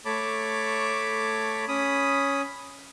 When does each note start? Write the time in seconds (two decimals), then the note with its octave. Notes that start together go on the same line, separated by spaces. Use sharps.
0.05 A3 C#5 A5 B5 D6
1.68 C#4 B5 D#6